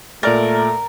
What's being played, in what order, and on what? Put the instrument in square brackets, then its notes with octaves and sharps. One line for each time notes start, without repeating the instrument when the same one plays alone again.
[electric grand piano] A#2 D5 A6 [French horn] A3 [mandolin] A#4